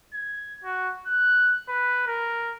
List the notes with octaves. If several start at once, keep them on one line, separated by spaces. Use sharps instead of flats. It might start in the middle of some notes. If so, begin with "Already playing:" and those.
G#6
F#4
F#6
B4
A#4